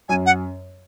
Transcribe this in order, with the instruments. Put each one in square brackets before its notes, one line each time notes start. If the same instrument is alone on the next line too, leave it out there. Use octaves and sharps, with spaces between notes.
[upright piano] F#2 [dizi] G#5
[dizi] F#5